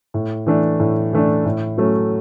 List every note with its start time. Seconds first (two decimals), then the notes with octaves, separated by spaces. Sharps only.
0.14 A2
0.46 E3 A3 D4
0.80 A2
1.13 E3 A3 D4
1.45 A2
1.78 F#3 A3 C#4